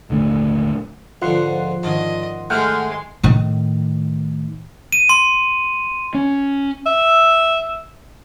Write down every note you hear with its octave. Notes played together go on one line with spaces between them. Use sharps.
D#1 G#1 D3 A3
C#2 G#2 D3 F3 F4 F#5 C6
G#2 D#3 C#4 D4 D#5
G#3 A3 E4 G#4 F#5 G5 C6 F6
A2 D#3
D#7
C6
C#4
E5